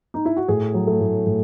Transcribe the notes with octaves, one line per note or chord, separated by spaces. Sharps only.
D#4
E4
F#4
A2 G#4
F#3
A3
A2
A2